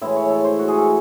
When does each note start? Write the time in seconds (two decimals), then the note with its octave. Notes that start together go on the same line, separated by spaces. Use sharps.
0.01 A2 E3 G#3 E4
0.16 C#5
0.30 A4
0.44 C5
0.59 F#4
0.68 G#4
0.78 A4